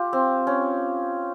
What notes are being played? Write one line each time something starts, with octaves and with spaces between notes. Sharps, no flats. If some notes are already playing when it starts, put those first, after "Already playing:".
Already playing: F4 G4
C4
C#4